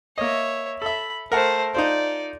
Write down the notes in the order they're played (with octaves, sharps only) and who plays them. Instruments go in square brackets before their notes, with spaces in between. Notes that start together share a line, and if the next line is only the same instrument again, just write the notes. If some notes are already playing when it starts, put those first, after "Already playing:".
[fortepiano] A#3 D#5 [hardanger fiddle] C#5 E5
[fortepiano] A4 E5 [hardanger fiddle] B5
[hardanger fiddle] A3 C5 [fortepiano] A#4 F#5 A5
[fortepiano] D#4 F4 C5 [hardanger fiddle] D5